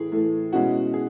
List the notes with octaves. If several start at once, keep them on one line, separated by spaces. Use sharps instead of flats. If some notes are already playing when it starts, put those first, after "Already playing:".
Already playing: A2 E3 A3 G#4
A2 E3 A3
B2 G#3 C#4 E4 F#4
G#4